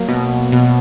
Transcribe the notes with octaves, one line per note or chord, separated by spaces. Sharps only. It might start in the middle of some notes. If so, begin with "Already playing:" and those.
Already playing: F#3 A#3
B2
B2